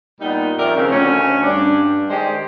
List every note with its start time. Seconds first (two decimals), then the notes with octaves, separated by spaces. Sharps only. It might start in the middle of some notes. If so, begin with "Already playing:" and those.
0.21 A#2 G3 B3 D#4
0.58 F2 D#3 C4 A#4 D5 E5
0.75 C#3 F3 C4
0.91 D2 C#4
1.43 G2 D4
2.10 D#3 G#3 G4 C5 D5 D#5